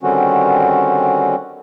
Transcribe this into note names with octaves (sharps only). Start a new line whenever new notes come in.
D3 D#3 G3 C4 C#4 F#4